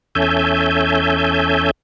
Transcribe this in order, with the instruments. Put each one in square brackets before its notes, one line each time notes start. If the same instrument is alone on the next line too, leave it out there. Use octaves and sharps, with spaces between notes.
[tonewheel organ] E2 C#4 A4 E5 G#5 G6